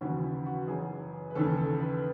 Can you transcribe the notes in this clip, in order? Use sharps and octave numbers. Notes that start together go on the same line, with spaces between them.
D#2 C#3 E3 F#4
E4
F#4
F#1 F#2 E3 G#4
B4
D#2 C#3 E3 A4
A4
B4